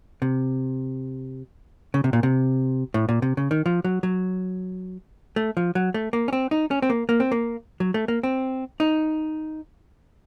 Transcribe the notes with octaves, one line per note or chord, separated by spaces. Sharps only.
C3
C#3
C3
A#2
C3
A2
A#2
C3
C#3
D#3
F3
F#3
F#3
A3
F3
F#3
A3
A#3
C#4
C4
D#4
C#4
C4
A#3
A#3
C4
A#3
F#3
A3
A#3
C4
D#4